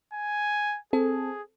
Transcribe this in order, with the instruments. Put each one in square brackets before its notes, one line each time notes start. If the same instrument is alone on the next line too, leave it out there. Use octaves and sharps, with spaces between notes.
[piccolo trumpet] G#5
[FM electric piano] C4 A4 [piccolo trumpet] G#4